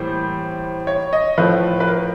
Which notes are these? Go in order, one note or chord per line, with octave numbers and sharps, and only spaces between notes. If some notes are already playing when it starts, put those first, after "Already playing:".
Already playing: A2 E3 G3 A#3 C5
C#5
D#5
A2 F3 A3 B4
B4
A#4